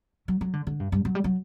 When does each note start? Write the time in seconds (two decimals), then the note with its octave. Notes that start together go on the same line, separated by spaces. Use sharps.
0.28 F#3
0.41 F#3
0.54 D3
0.67 D3
0.80 G2
0.92 G2
1.05 F#3
1.15 G3
1.24 F#3